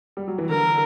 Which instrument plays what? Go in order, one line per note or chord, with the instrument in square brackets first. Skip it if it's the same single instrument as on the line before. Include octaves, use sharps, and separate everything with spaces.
[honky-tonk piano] G3
F#3
E3
[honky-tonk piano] D3 [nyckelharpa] A#4